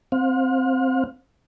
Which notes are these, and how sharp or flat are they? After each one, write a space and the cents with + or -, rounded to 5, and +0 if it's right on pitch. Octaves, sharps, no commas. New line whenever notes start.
C4 +0 F5 +40